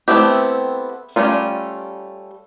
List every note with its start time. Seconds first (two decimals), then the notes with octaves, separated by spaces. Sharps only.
0.08 A3 B3 C4 E4 G4
1.16 G3 A3 C#4 F4